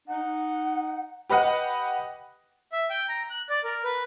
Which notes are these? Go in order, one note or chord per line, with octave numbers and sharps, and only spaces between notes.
D#4 F#5
G4 B4 D#5 F#5
E5
G5
A#5
F#6
D5
A#4
B4